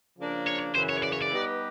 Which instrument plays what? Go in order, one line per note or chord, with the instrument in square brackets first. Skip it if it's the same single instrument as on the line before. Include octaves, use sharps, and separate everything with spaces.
[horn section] C#3 F3 A#3 D4
[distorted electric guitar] C#5
[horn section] F#2 C#3 E3 [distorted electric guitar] C5
[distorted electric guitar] C#5
D5
C#5
D5
[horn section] G3 B3 D#4 G4 B4